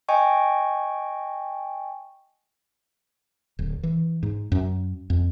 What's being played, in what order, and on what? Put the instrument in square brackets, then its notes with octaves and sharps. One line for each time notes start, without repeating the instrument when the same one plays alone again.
[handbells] D#5 G5 G#5 C#6
[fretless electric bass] D1
E3
G#2
F#2
F2